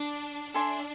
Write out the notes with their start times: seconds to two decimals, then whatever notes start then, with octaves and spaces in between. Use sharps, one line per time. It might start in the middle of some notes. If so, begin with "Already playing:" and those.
Already playing: D4
0.54 D4 A4 E5 G#5 C6